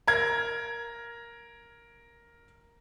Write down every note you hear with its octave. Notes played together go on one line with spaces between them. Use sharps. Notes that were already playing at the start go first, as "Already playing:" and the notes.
A#4 G#6